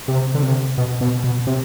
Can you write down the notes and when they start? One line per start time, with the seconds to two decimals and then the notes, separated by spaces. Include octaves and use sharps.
0.08 C3
0.35 D3
0.42 C3
0.78 B2
1.01 B2
1.24 B2
1.47 C3